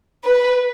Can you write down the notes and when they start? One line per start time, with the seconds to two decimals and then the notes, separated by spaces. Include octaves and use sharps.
0.24 B4